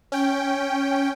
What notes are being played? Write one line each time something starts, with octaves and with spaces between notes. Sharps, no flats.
C#4 G5